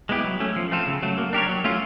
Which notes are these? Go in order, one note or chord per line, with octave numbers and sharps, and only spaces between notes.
G#3 B3 E4 G4
F#3
A3 C#4
F3
A3 C4 F4 A4
C#3
F#3 A3
A#3
D4 G4 A#4 C#5
F#3
A3 C#4 F4